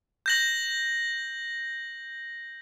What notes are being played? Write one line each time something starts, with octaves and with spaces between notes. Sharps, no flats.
G6 A#6 F#7